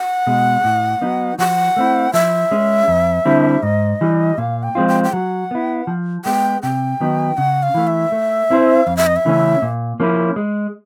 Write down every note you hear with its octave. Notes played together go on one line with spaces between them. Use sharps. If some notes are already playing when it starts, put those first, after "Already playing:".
Already playing: F#5
B2 G#3
A2
F#3 B3 D#4
F3 F#5
A3 C4 E4
F3 E5
G#3 C#4
F2
D3 G3 C4 E4
G#2 D#5
E3 G3
A#2 F5
G5
F3 G#3 C4 F4
G5
G5
F#3 F#5
B3 E4
F3
G#3 B3 G5
C3 G5
D#3 F#3 B3 D#4
C#3 F#5
F5
E3 A3
E5
A3
C4 E4 A4 C5
F2 F5
E5
D#5
E5
C#3 E3 A3 C#4
A#2
F3 A#3 C#4 E4
G#3